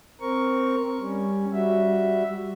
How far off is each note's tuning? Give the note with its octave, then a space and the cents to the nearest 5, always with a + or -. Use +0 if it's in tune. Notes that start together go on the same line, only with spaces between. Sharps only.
C4 +0 A#4 +0 C#6 +5
G3 +10 C#4 +0
G3 +0 F#4 +0 E5 +0